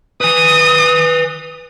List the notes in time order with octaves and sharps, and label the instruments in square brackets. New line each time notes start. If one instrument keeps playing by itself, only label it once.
[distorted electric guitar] B4 G#5 [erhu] D#6